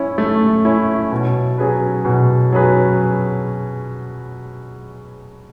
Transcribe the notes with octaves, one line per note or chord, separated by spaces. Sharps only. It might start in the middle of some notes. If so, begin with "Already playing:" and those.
Already playing: C#4 E4
A3
C#4 E4
B2
F#3 C#4 G#4 B4
B2
F#3 C#4 G#4 B4